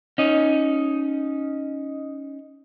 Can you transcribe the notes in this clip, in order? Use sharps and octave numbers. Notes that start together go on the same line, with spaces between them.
C#4 D#4